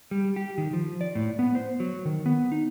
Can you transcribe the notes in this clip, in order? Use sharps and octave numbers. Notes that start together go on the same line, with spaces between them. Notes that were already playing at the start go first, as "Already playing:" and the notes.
G3
G4
D#3
F3
D5
A2
B3
C5
F#3
D#3
B3
D#4